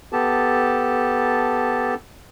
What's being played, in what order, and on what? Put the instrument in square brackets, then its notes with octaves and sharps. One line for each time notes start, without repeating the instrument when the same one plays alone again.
[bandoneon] B3 G4 A4 A5